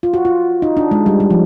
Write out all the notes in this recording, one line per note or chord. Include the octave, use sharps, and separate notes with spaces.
F4
F#4
F4
D#4
D4
G#3
G3
G3
F3